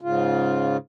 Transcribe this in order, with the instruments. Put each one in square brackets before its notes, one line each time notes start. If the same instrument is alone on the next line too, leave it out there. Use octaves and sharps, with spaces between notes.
[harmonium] G#2 C#3 F4